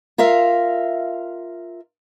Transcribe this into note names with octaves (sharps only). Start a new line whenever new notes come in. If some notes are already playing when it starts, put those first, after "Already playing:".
F4 A#4 E5 F5